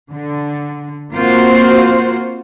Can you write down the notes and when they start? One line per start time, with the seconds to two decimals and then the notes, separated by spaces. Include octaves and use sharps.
0.10 D3
1.13 A#3 C4 F4 F#4 C5